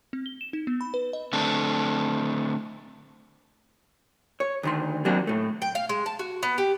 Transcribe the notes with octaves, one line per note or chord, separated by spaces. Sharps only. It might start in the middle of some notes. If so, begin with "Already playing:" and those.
C4
G7
E7
D#4
B3
B5
B4
D#5
D3 A3 C4 D4
C#5
D2 D#3 C6
F#3 A#3 C4 D4 F#4
A2 A3
G5
F5
G#3
A5
F#4
B3
G4